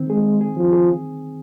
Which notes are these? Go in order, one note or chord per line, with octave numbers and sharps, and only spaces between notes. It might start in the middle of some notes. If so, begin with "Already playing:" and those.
Already playing: D#3 C4
G#3 G#4
G#4
F3
G#4